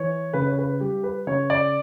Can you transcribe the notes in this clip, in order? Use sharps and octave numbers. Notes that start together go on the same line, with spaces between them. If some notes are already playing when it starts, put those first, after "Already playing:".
Already playing: E3 C#5
C#3 B4
C#5
B4
G3 G4
B4
C#3 C#5
D5